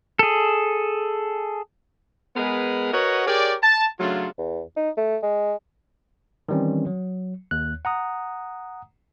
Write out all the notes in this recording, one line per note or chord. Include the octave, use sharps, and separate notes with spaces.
G#4 A4
G#3 B3 G#4 A#4 B4
F#4 A#4 B4 C#5 D#5 F#5
G4 G#4 A#4 C#5 D5
A5
C#3 F#3 A3 D4 F4
E2
D#4
A3
G#3
D#3 E3 G3 C4 C#4
F#3
D#2 F#6
F#5 A#5 D#6